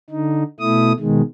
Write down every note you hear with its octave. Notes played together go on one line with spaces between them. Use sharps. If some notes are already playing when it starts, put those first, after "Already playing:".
D3 D#4
B2 A3 E4 D#6
B2 D#3 G#3